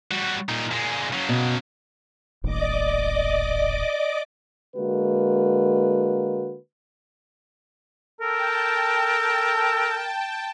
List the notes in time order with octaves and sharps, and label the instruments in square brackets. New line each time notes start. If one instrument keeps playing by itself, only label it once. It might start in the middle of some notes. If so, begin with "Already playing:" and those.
[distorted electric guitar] G3 F#4
A#2 D#4
A#2 G#3
C#3 F#3
[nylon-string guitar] B2
[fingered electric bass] D#1 A1 D#2 [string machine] D5 D#5 D6
[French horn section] D3 G#3 A#3 F#4 B4
[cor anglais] A4 [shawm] A#4 [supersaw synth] G5 A5